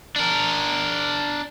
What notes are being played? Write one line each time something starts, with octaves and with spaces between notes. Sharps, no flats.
D4 A#4